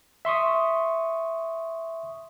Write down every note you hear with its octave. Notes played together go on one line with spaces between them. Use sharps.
E5 C6 C#6 D#6